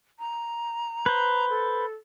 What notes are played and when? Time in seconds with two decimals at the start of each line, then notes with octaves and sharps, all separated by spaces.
0.19 A#5
1.06 B4 C5
1.50 A4